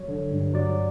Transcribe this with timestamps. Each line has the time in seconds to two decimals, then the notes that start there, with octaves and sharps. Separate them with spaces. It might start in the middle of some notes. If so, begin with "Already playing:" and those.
Already playing: F#3 C#5
0.08 D3
0.31 G2
0.54 F#3 D5